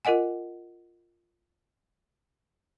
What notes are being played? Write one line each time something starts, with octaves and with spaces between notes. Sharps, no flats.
F4 A#4 D#5 F#5 G#5